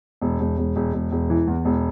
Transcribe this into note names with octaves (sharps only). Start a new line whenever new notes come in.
E1
E1
E1
E1
E1
E1
E3
E2
E1